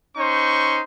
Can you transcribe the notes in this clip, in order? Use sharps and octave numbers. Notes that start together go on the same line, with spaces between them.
C#4 D#4 C5 C#6